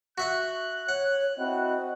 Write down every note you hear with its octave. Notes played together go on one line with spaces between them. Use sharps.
F#4 E5 F#5 F#6
C#5 F#5
C4 E4 F#4 D#5